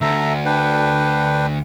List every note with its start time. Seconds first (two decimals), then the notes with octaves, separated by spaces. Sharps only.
0.01 D2 A4 E5 A#5
0.45 D4 B4 G5